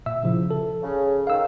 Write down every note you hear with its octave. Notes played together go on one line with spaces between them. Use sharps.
A#2 E5 E6
C#3 F3 E4
A4
C#3
D#3 F5 E6